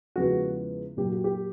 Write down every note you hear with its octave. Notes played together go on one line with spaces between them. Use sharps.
E2 C#3 F3 G#3 B3 F#4
A#2 F#3 A#3 G4
F#4
G4